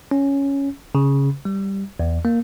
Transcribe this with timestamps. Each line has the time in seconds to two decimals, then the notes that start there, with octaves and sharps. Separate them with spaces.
0.11 C#4
0.95 C#3
1.45 G3
2.00 E2
2.25 A#3